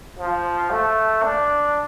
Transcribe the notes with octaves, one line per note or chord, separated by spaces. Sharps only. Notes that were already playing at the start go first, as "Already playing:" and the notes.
F3
A3
D4